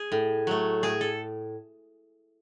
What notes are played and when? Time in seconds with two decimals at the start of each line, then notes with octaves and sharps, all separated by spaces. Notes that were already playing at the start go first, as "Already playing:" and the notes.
Already playing: G#4
0.12 A2
0.47 F#3 A3
0.83 A2 G#4
1.01 A4